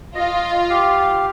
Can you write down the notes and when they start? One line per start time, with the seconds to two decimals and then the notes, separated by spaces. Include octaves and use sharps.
0.15 F4 D#5
0.70 G4 F5